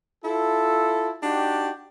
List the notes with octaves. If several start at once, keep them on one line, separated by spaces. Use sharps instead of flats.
E4 F4 A4
D4 D#4 F#4 G4